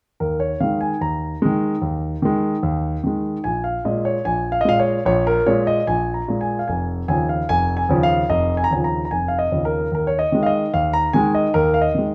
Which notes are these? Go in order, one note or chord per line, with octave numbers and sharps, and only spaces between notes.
D#2 A#4
C#5
D#3 G#3 F5
G#5
D#2 A#5
D#3 G#3
D#2
D#3 G#3
D#2
D#3 G#3
A#1 G#5
F5
A#2 G#3 D#5
C#5
A#1 G#5
F5
D#5
A#2 G#3 F5
C#5
A#1 C#5
A#4
A#2 G#3 C#5
D#5
A#1 G#5
A#5
A#2 G#3
G#5
F5
F1 G#5
D#2 C#3 F3 G#5
F5
F1 G#5
G#5
D#2 C#3 F3
F5
F1 D#5
G#5
A#5
D#2 C#3 F3 G#5
A#5
A#5
F1 G#5
F5
D#5
D#2 C#3 F3
A#4
D#2 A#4
C#5
D#5
D#3 G#3
F5
D#5
D#2 F5
A#5
D#3 G#3 G#5
D#5
D#2 A#4
F5
D#5
D#3 G#3